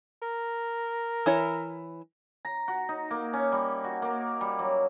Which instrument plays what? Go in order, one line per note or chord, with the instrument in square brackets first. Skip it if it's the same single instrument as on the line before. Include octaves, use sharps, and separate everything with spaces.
[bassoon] A#4
[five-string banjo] E3 E4 C#5
[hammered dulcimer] A#5
F#4
D#4
A#3
C#4
G3
F#4
A#3
G3
F#3